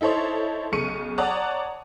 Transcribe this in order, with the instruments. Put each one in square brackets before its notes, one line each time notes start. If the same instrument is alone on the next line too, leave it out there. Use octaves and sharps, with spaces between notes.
[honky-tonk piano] D#4 E4 A4 C5 C#5
B1 C#3 C#6 C#7 D#7
C#5 D5 F#5 A5 A#5 D#6